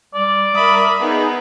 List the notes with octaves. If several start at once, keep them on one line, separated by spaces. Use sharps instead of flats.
G3 D5
A#4 E5 B5 D#6
B3 D#4 G#4